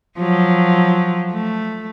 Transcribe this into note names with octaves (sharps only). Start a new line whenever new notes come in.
F3 F#3
A3